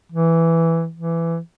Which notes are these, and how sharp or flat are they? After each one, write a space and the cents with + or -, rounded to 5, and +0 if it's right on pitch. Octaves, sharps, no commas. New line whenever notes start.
E3 +5
E3 +15